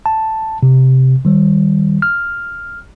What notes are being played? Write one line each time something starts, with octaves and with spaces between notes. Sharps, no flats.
A5
C3
D#3 G3
F6